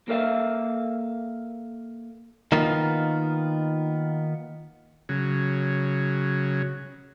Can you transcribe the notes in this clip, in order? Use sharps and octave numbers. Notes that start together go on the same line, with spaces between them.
A#3 A4 A#4 D5 E5 F5
D#3 A#3 B3 D#4 F4
C#3 F#3